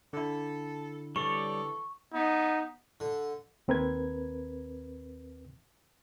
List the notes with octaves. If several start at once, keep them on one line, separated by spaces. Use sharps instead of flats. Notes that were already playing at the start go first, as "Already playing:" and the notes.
D3 E4 A4
E3 G3 A4 C#5 D5 C#6
B3 D#4
D3
D#2 C4 A#4 B4 G#6